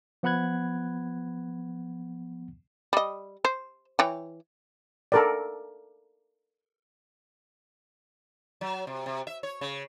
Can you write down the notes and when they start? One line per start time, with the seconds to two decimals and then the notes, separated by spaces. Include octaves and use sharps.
0.23 F3 B3 F#5 B5 F#6 G#6
2.93 G3 D#5
3.45 C5
3.99 E3 C#5 G5
5.12 A4 A#4 D5
8.61 F#3
8.87 C3
9.06 C3
9.27 E5
9.43 C#5
9.61 C#3